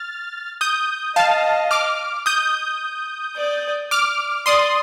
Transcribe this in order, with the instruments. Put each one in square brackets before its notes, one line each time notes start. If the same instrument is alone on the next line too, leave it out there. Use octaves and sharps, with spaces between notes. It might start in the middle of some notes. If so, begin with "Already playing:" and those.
Already playing: [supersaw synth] F6 A6
D#6 G6
[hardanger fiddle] D#5 [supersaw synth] F5 A5
[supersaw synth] D6 F6
D#6 G6
[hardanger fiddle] D5
[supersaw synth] D6 F6
[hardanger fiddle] D5 [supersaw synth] C6 D#6